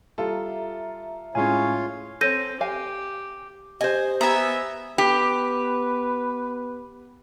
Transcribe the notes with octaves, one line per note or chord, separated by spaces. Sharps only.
G3 F4 A4 E5 A#5
A2 G#3 C#4 F4 C#5 F5 G#5
C4 A4 C#5 G6 A#6 D#7
G4 F5 G#5
G4 C5 D#5 G#5
B3 E5 G#5 A#5
B3 G4 B4